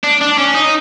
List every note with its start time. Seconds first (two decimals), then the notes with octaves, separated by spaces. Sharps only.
0.04 D4
0.21 D4
0.38 C#4
0.55 D#4